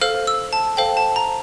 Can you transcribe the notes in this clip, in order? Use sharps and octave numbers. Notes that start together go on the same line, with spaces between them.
A4 C5 F5 F6
E6
A5
A4 C5 F5 G5
A5
A#5